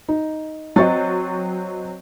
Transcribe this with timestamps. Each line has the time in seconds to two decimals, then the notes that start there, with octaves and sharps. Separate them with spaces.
0.09 D#4
0.76 F#3 C4 D#5 C#6 A6